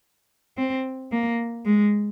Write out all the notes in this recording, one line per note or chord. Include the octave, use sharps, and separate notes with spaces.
C4
A#3
G#3